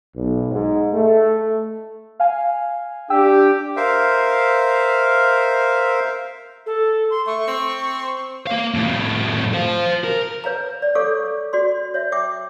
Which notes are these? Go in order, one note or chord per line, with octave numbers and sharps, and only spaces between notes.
B1
G#2
A3
F5 G#5
D4 G4 G5 E6
A#4 C5 E5 F5
A4
C6
A3 C#6
C4
A#3 F5
F2 A2
C5 F5
A#4
B4 C#5 F5 A#5
D5
A4 C#5 F5 C#6 D6
F#4 D5 C6
C#5 E5
E5 G5 D6